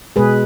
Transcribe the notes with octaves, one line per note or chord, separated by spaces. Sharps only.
B2 G#3 G#4 B4